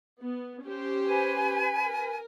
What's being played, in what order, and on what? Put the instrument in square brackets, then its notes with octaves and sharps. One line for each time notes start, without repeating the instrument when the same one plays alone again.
[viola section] B3
C#4 G4 C5
[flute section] B4 G#5
[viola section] A#4